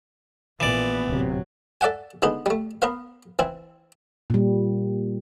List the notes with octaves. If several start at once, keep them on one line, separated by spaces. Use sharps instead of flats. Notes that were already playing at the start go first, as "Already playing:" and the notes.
A#1 A#2 E3 B3 D5
D1 C3 F#3
A4 D5 E5 F#5 G#5
D3 G#3 B3 D4 D#4
G3 A3
B3 A#4 B4 F5
E3 C4 E4
A#2 G3